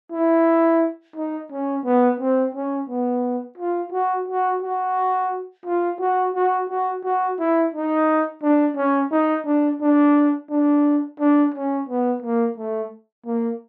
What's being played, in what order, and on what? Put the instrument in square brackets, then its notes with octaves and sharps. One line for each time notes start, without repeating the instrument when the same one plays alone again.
[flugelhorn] E4
D#4
C#4
B3
C4
C#4
B3
F4
F#4
F#4
F#4
F4
F#4
F#4
F#4
F#4
E4
D#4
D4
C#4
D#4
D4
D4
D4
D4
C#4
B3
A#3
A3
A#3